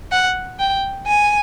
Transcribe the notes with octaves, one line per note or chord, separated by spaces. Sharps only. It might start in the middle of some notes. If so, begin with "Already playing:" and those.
F#5
G5
G#5